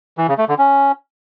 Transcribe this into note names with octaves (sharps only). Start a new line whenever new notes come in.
E3
C#3
A3
D3
C#4